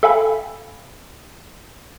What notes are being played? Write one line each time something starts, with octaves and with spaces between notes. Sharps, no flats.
A4 E5 F5 G5 G#5 B5